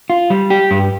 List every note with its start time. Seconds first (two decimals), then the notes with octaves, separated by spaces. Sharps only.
0.10 F4
0.30 G3
0.50 G4
0.71 G2